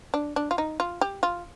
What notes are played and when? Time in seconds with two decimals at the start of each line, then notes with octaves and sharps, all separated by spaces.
0.14 D4
0.36 D4
0.51 F4
0.58 D#4
0.80 F4
1.01 G4
1.23 F4